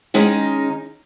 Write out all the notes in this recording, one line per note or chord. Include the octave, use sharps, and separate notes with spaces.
D#3 G#3 C#4 D#4